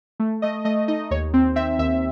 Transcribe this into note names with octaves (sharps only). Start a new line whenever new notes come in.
A3
A3 D#5
A3 D#5
D#4 D#5
D#2 C#5
C4
C4 E5
D#2 E5